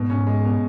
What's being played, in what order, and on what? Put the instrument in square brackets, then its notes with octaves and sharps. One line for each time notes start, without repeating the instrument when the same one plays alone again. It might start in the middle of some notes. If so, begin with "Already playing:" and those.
Already playing: [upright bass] G#2 [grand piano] B2
[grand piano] C#4
G#3
B2